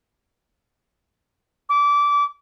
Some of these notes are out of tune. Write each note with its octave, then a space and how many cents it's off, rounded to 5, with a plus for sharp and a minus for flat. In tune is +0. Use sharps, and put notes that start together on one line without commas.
D6 -20